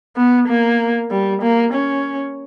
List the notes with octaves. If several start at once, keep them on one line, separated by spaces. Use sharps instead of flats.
B3
A#3
G3
A#3
C#4